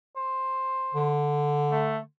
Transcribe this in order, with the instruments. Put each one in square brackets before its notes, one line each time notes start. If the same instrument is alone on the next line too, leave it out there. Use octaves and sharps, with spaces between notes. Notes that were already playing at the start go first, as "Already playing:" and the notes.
[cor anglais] C5
[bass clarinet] D3
[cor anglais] A3